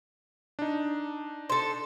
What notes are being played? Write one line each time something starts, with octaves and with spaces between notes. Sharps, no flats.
D4 D#4
A4 C5